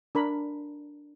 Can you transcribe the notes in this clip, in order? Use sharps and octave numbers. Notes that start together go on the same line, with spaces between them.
D4 A#4 B5